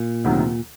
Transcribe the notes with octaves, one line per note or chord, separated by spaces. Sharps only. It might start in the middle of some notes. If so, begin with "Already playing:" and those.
Already playing: A#2
D2 C3 D#3 F#3